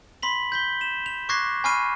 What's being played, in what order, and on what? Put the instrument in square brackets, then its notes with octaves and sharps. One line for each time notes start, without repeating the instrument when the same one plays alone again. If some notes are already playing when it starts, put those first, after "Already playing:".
[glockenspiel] B5 C6 B6 F#7
G6 B6 G7
E7
F7
C#6 D6 F#6 G#6 A#6 C7
G#5 B5 C#6 F6 C7 D#7